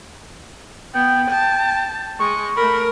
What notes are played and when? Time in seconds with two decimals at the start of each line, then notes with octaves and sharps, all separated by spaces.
0.94 B3 G5
1.31 G5 A5
2.19 G#3 C#6
2.56 A3 A#4 B5